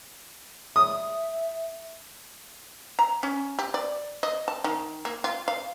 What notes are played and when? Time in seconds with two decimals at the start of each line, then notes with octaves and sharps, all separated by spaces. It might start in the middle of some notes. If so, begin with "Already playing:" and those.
0.76 E5 D#6
2.99 A#5
3.23 C#4
3.59 G4
3.74 D5
4.23 D#5
4.48 A5
4.64 D#3
5.05 A#3
5.24 F4
5.48 F5